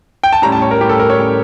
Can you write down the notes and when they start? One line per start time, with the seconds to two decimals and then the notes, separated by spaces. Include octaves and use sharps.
0.24 G5
0.33 A5
0.42 A2 G3 C#4 A#5
0.52 A5
0.62 C#5
0.71 A#4
0.81 A2 G3 C#4 G4
0.89 A4
0.99 A#4
1.10 C#5
1.18 A2 G3 C#4